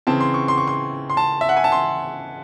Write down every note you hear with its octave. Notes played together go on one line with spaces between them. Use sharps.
C#3 E3 C4 A5
C6
C#6
C6
C#6
C6
C6
A5
E5
F#5
G#5
A5
C6